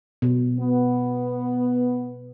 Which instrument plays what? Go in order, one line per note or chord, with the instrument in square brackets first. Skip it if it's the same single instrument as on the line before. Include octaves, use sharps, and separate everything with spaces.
[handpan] B2
[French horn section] B3